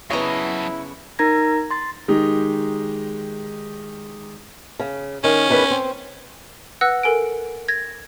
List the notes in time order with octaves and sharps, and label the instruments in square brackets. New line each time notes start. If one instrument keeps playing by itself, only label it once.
[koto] C#3 D#5 A#5 [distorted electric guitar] F#3 A5 [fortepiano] B3 C#5 [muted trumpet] E4
[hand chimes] D#4 A#4 A#5 G#6 A#6
C6 A6
[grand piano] D#3 G#3 D#4 G4
[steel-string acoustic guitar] C#3
[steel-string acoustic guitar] D#3 [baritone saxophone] C#4
[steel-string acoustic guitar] E2 D#3 B4
C4
[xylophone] B4 F#5 E6 F#6 A#6
A4 A#4 G#5 D7
G#6 A#6